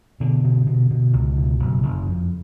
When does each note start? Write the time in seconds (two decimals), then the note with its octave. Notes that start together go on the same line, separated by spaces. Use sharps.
0.20 B2 D3
0.44 B2
0.67 B2
0.91 B2
1.13 C#2
1.37 B2
1.59 F#1
1.83 F#1
2.07 F2